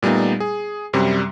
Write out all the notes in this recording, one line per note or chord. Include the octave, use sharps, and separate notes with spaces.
A#2 G3 A3 B3 D#4
G#4
F#2 C3 G3